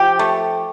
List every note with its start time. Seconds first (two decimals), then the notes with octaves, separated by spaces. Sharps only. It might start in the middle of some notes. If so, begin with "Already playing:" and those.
Already playing: F3 G4
0.19 A3